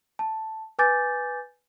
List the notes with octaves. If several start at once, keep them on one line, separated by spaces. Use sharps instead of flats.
A5
B4 G#5 D6 G6 A6